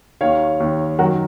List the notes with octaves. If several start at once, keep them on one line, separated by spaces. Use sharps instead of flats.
D#2 D#3 C#5 F5
D#2 D#3
F#2 D#3 F#4 A#4